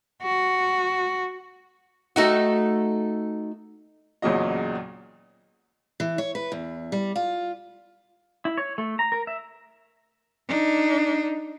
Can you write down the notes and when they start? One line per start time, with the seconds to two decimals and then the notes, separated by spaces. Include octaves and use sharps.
0.23 F#4
2.16 A3 D#4 F#4
4.22 A1 E2 A#2 C#3 F#3 D#5
6.00 E3
6.18 C#5
6.35 B4
6.52 E2
6.92 G3
7.16 F4
8.45 E4
8.58 C#5
8.78 A3
8.99 A#5
9.12 A#4
9.27 E5
10.48 D4 D#4